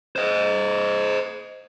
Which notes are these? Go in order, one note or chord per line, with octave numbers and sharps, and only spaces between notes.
C5 D#5